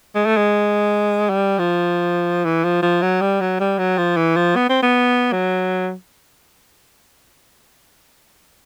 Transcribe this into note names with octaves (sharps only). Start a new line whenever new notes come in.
G#3
A3
G#3
G3
F3
E3
F3
F3
F#3
G3
F#3
G3
F#3
F3
E3
F3
B3
C4
B3
F#3